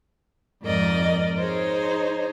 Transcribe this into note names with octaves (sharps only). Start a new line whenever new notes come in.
F2 G#2 A#4 D5 D#5
D#4 G#4 C5 C#5